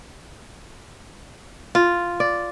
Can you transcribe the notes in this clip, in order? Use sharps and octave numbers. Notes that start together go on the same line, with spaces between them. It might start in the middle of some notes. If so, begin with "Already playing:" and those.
F4
D5